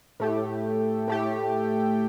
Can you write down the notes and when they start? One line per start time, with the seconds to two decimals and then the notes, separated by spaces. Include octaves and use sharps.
0.20 A2 A3 G4
1.08 A2 A3 G4